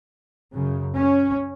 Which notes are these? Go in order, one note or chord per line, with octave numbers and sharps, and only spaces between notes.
F#2 C#3
C#4